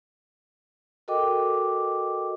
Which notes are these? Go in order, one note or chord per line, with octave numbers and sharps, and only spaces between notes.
F#4 A4 A#4 D#5 G5 D6